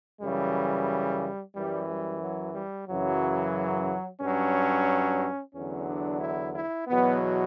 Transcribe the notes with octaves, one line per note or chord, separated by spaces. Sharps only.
F#2 C#3 E3 G3
F#2 E3 G3
G3
F#3
G3
F#2 C#3 E3 F#3
G2 F#3 C#4
E2 D3 F#3 C#4
D4
E4
E4
E2 B2 F#3 B3